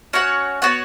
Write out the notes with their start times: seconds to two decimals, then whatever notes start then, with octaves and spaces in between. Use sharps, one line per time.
0.13 C#4 F#4 C#5 F#5
0.62 B3 F#4 C#5 F#5